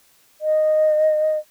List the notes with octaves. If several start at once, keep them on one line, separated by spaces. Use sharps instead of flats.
D#5